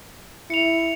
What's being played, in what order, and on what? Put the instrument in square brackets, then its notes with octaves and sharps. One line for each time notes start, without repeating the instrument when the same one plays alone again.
[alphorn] E4 [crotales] C#7 F7